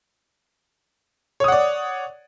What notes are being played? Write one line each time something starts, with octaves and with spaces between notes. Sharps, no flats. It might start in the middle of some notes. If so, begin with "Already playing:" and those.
C#5 D5 F#5 D#6